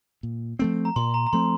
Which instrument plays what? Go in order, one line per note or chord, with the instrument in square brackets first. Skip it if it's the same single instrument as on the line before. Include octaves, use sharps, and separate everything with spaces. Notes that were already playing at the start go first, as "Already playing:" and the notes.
[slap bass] A#2
F3 A3 C4
[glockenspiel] A#5
[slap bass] A#2 [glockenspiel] C6
[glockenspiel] A#5
A#5
[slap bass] F3 A3 C4 [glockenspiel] C6